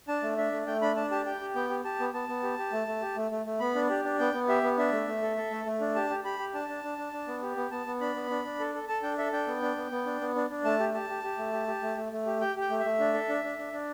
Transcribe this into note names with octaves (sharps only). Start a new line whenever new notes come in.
D4 A5
A3
D4 E5
A3
A3 G5
D4 B5
D4 A5
G4 A5
G4 G5
G4
B3 G5
G4
G4 A5
B3
B3 A5
B3
G4
G4
A3
A3
G4
A3
A3
A3
B3 B5
D4
G4
D4
B3 G5
B3
G4 E5
B3
D4 E5
A3
A3
A4
A4
A3
A3
D4
G4 A5
G4
G4 B5
G4
D4 A5
D4
D4
D4
D4
B3
G4
B3
B3 A5
B3
D4 B5
B3
D4
D4
A4
A4
A4 A5
D4 G5
A4 E5
D4 G5
B3
D4
B3
B3
D4
B3
D4
D4
A3 A5
G4
G4 A5
G4
G4
A3
G4
G4
A3
A3
A3
G4
G4 G5
G4 G5
A3
E5
A3
D4
A4
D4
D4
D4
D4